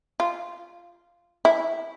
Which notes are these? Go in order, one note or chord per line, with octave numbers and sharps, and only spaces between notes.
F4
E4